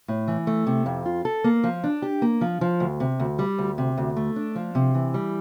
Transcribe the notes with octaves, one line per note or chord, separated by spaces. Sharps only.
A2
E3
A3
C3
F2
F4
A4
A#3
F3
D4
G4
A#3
F3
F3
D2
C3
D2
G3
D2
C3
D2
A3
D4
F3
C3
E3
G3